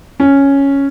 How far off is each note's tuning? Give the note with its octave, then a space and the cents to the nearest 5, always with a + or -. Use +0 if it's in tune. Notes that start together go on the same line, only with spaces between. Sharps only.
C#4 +0